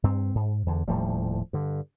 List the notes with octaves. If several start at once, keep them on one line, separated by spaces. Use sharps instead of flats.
G2 C4
G#2
E2 D3
D#1 A2 F3 G3
G2 D3